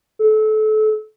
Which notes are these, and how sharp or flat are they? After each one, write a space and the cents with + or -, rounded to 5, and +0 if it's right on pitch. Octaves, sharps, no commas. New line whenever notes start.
A4 -30